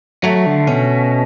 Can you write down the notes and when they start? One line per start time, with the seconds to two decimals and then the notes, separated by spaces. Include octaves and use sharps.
0.24 F#3 A3
0.46 D3
0.67 B2 C#4